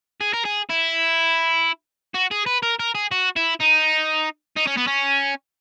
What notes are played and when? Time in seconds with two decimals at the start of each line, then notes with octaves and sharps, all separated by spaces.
0.21 G#4
0.33 A#4
0.45 G#4
0.69 E4
2.14 F#4
2.31 G#4
2.46 B4
2.63 A#4
2.80 A#4
2.95 G#4
3.12 F#4
3.36 E4
3.60 D#4
4.57 D#4
4.67 C#4
4.77 B3
4.88 C#4